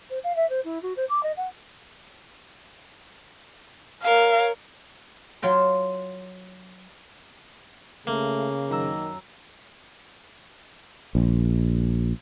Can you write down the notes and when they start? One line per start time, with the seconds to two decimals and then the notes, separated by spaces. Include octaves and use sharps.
0.10 C5
0.23 F5
0.36 E5
0.49 C5
0.64 E4
0.82 F#4
0.96 C5
1.09 D6
1.23 D#5
1.37 F#5
4.03 A#4 C#5 F5
5.42 F#3 F4 G5 A#5
8.07 C#3 A3 A#3
8.70 F#2 D#3 A#5 E6
11.15 A#1